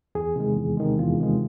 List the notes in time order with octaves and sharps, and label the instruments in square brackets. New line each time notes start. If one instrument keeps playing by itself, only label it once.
[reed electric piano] E2 G#4
C3 D#3 G#3
E2
C3 D#3 G#3
E2 F4
C3 D#3 G#3